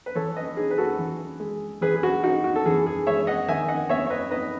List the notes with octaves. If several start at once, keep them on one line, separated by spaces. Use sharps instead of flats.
B4
E3 A4 C#5
B4 D#5
D#4 G#4
B4
F#4 A4
E3
G#3
E3 G#4 B4
G#4
F#4
D#4 F#4
F#4
A4
E3 G#4
G#4
G#3 C#5 E5
D#5 F#5
D#3 E5 G#5
D#5 F#5
B3 C#5 E5
C#5
B4 D#5
D#4 B4 D#5